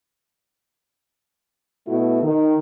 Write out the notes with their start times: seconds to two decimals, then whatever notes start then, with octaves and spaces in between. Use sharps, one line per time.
1.87 B2 A3 E4 F#4
2.23 D#3